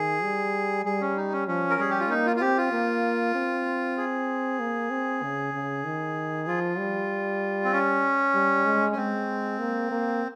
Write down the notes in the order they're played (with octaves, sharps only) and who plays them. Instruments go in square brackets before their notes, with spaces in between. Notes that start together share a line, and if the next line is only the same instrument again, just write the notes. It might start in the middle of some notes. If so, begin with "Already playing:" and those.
Already playing: [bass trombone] D#3 [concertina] G#4
[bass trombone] G3
[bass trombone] G3 [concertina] G#4
[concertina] C#4
D#4
C#4
[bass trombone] F3 [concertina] C#4
[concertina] A#4
[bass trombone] G3 [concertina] G#4
[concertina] G4
F4
[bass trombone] A#3 [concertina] D#4
[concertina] F4
F4
[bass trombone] C4 [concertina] G4
[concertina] F4
[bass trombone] A#3
C4
[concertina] G#4
[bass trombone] A#3
C4
C#3
C#3
D#3
[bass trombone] F3 [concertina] F4
[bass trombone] G3
[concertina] C4
C#4
[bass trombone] G3
G#3
[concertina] C#4
[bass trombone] G#3 [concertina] C4
[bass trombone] A#3
A#3